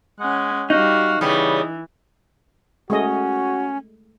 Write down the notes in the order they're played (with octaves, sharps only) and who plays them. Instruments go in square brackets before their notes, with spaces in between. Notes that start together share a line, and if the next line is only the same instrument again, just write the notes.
[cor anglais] G#3 [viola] C#4 F#5
[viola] G3 F5 [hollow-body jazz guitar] D#4 [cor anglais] F#4
[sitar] C#3 G3 B3 [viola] E3 [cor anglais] D#5
[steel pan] G#3 A3 D#5 [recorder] C#4 [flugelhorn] F#4